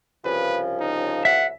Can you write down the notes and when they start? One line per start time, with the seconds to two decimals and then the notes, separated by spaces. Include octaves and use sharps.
0.25 C2 C#3 F3 B4
0.80 D#4
1.25 E5 F#5